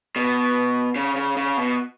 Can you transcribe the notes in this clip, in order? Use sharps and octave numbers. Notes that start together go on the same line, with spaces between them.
B2
C#3
C#3
C#3
B2